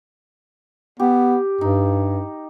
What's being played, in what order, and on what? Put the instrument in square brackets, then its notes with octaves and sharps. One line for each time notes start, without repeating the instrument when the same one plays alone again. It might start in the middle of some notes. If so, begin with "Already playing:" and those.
[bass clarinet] B3 [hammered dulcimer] G4
[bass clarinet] G2 [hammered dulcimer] D#4